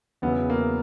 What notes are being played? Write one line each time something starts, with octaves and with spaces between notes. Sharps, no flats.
E2 C#3 F#3 B3
A#3